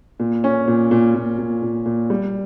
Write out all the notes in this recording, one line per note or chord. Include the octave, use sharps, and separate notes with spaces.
A#2
C#4
A#2
A#2
A#2
A#2
A#2
A#2
G3